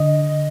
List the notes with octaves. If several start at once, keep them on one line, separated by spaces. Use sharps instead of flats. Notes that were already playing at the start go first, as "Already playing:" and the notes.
Already playing: D3 D#5